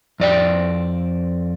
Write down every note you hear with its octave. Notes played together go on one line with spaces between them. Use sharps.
F2 D5 G5